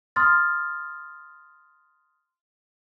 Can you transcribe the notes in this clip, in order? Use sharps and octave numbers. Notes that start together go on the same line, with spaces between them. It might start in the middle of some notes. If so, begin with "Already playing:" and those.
C6 D#6 F6 A6